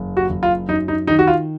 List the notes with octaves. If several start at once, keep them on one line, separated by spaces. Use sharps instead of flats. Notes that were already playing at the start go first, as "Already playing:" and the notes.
Already playing: F#1
F#4
F#1
F4
F#2 D#4
D#4
D#3 D#4
F#4
F4